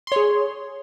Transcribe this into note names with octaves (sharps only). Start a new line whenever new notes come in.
G#4 C#5 C6